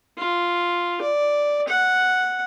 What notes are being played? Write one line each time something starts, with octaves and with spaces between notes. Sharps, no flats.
F4
D5
F#5